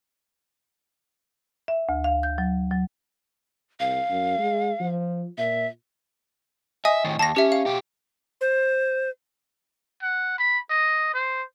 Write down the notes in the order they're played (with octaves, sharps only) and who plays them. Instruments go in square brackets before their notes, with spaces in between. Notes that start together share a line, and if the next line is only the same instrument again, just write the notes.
[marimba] E5
D2
F5
G6
F#3
F#3
[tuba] C2 [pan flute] F5
[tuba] F#2
G#3
F3
[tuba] A#2 [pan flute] E5
[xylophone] D#5 G#5 D#6 [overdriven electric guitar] E5
[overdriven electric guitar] A2 D#3
[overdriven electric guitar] D#2 [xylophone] A5 A#6
[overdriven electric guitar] C#4 [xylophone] G4 E5
[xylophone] F5
[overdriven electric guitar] B2 G4
[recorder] C5
[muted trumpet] F#5
B5
D#5
C5